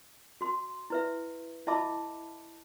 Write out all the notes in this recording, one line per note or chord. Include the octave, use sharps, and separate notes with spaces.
F#4 C6
E4 B4 E5
E4 D#5 E5 A5 B5 D6